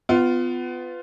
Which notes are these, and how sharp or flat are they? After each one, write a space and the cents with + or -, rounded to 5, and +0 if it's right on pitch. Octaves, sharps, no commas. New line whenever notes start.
B3 +25 F4 +0